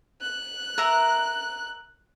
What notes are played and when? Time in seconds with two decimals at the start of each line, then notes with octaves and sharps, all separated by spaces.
0.21 F#6
0.78 A#4 E5 A#5